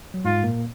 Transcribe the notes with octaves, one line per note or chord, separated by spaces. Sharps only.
F#3
G#2 G#3 F4
A#2 A#3